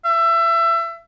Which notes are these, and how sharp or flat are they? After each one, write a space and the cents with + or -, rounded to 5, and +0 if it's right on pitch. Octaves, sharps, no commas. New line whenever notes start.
E5 +25